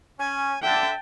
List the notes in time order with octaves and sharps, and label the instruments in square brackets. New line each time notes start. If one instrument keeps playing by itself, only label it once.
[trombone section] C#4 [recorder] G#5
[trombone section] D3 [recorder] E5 [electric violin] G5 A5